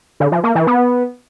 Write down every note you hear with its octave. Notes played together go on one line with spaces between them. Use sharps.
D3
F3
A#3
E3
B3